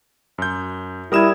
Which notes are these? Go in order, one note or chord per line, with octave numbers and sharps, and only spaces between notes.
F#2 G6
G3 E4 A#4 D#6 G#6 E7